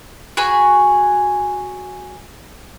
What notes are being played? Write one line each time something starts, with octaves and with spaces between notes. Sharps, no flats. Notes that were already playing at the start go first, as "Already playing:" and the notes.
F#4 G#4 G#5 B5